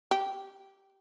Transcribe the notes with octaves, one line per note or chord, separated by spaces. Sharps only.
G4